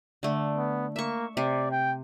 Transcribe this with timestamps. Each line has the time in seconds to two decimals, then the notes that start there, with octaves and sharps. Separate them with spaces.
0.23 D3 A3
0.56 B3
0.96 A#3 E5 C#6
1.37 C3 D5
1.71 G5